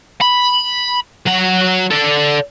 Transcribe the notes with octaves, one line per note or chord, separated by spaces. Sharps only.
B5
F#3 F#5
A4 D5